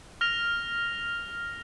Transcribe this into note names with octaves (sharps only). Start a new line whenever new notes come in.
F6 A#6 F7